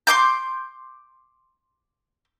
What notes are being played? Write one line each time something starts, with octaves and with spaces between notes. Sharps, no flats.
C6 D6 G6